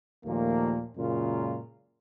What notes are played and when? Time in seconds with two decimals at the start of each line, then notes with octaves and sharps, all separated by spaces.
0.25 D#2 A#2 F3 A3 A#3
0.96 F#2 A#2 C#3 G#3 F4 A#4